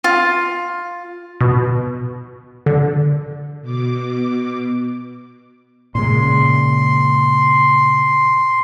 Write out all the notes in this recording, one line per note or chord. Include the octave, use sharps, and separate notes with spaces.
F4
B2
D3
B2 D6
A#2 C#3 G#3 C6